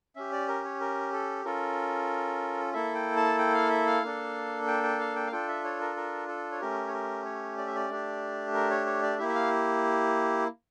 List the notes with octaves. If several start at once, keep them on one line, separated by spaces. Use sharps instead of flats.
C#4 G4 E5
D5
A#4
C#5
A#4
A4
C#4 F4 A4 A#4
A#3 E4 A4 E5
G5
A5
G5
F5
E5
F5
A#3 D4 A4
G5
G5
F5
G5
F5
D4 F4 A4 G5
E5
C#5
A#4
A#4
A4
C#5
A3 C#4 G4 A#4
C#5
A#4
C#5
D5
E5
D5
A3 D4 G4
A#4
C#5
C#5
D5
A#3 E4 G4 E5
E5
F5